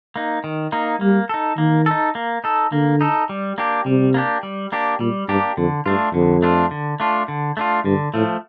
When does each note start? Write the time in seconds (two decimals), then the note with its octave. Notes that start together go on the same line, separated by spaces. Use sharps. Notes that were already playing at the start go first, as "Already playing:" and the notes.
0.16 A#3 D#4
0.44 D#3
0.72 A#3 D#4
1.01 G3 A#3
1.29 D#4 A4
1.58 D#3 A#3
1.86 D#4 A4
2.15 A#3
2.44 D#4 A4
2.72 D3 A#3
3.01 D#4 A4
3.29 G3
3.58 A#3 D4 G4
3.86 C3 G3
4.14 A#3 D4 G4
4.43 G3
4.72 A#3 D4 G4
5.00 A#2 G3
5.29 G2 A#3 D4 G4
5.57 F2 D3
5.86 G2 A3 D4 F4
6.14 F2 D3
6.42 A3 D4 F4
6.71 D3
7.00 A3 D4 F4
7.28 D3
7.57 A3 D4 F4
7.85 G2 D3
8.14 A2 F3 A3